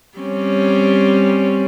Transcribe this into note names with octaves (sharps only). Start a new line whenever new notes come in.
G3 C4 C#4